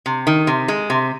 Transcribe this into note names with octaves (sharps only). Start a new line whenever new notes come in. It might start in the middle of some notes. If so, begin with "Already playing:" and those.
C3
D#3
C3
G#3
C3